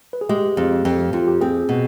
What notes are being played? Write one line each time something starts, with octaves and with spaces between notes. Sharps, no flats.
B4
G#4
G#3 G4
F2
F2
F2 F4
G4
C4 G#4
B2